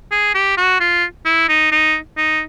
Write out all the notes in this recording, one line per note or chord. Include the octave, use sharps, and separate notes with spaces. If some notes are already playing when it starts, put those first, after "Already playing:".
G#4
G4
F#4
F4
E4
D#4
D#4
D#4